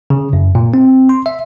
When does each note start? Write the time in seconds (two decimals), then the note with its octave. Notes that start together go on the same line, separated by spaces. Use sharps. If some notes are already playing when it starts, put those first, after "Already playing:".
0.10 C#3
0.33 F#2
0.55 A#2
0.74 C4
1.09 C6
1.26 E5